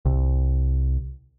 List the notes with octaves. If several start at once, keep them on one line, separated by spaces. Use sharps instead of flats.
C2